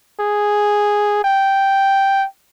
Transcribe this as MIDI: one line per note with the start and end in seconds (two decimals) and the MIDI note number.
0.20 1.23 68
1.24 2.26 79